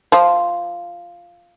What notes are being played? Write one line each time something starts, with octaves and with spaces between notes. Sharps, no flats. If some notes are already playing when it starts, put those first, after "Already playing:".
F3 F4